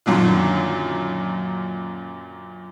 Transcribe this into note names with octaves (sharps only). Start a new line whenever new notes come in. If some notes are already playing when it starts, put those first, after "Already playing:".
F#2 A#2 D3 D#3